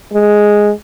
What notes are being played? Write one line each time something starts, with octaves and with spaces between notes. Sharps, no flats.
G#3